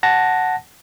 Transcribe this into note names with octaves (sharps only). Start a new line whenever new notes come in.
F#5 A5 A#6